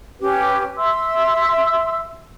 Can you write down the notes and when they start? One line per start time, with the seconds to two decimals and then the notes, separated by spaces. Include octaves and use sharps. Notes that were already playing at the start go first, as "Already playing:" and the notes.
0.20 C#4 G4 B4
0.77 E5 C6 E6